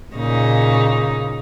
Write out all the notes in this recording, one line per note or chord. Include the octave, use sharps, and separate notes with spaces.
A#2 C#3 D#4